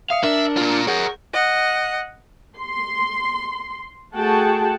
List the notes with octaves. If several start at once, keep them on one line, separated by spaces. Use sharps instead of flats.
E5 F5 D#6 C#7
D4 A#4 E5
A#2 F4
G#4 A#4 C#5 F#5 G6
D#5 F#5
C6
A3 F#4 G#4 F#5 G5 A5